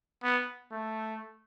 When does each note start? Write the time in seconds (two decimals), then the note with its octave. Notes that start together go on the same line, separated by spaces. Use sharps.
0.24 B3
0.72 A3